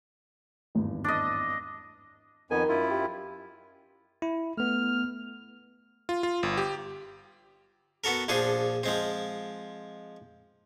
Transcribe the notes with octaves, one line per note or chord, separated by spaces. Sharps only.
G#1 E2 G2
D4 D#5
F2 D#3 B3 G#5
F#2 E4 F4
G4
E4
A3 B3 F6
F4
F4
G1
G4
B3 F#4 A4 A#4
A#1 F3 D4 G#4 C6
F3 G#3 C4